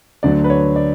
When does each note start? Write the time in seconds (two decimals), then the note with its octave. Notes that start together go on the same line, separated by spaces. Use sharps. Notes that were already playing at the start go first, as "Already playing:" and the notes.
0.23 D2 D3 F#3 D5
0.44 B4
0.50 C#5
0.76 D5